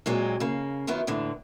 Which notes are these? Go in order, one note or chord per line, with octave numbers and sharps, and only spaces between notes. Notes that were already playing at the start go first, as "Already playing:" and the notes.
A#2 F#3 G#3 C4
C#3 A#3
F#2 D#3 B3 E4 F4
D#2 A2 D3 E3